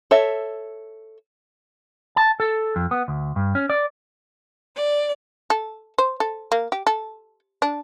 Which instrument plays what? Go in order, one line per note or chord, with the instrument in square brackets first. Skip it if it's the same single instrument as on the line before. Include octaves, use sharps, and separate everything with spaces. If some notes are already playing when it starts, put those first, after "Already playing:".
[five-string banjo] A4 C#5 E5
[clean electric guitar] A5
A4
F2
B3
D2
G2
C#4
D5
[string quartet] D5
[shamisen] A4
C5
A4
A#3
G4
A4
D4